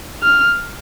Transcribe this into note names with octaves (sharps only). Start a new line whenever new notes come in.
F6